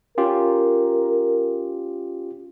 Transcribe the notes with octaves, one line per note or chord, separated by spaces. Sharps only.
C#4 F4 G4 A#4